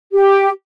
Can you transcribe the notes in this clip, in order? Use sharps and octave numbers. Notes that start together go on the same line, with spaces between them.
G4